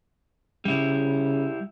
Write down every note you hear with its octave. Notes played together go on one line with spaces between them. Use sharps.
C#3 G3 E4